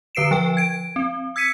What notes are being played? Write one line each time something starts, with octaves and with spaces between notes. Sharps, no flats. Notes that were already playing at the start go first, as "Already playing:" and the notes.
D3 B4 C7 D7 E7
F3 B4 G5
G#6 D7
C4
E6 G#6 B6 C#7 D#7